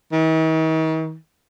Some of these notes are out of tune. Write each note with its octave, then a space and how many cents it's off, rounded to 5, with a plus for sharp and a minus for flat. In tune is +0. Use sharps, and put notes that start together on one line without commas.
D#3 +45